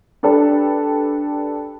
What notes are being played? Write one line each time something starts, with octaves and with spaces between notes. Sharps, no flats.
D4 G4 A4 B4